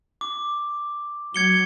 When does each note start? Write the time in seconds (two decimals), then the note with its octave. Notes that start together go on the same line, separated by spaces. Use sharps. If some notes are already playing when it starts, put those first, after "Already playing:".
0.21 D6
1.34 F#3 G#6 C#7 G7